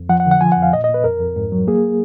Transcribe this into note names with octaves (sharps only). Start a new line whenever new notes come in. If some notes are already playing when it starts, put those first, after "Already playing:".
Already playing: F2
F3 F#5
F#5
D3
F#5
F3 G#5
F#5
F2
F5
A#2 D#5
D#5
A#2
B4
F2 A#4
F2
G#2
F#3
A#3 G#4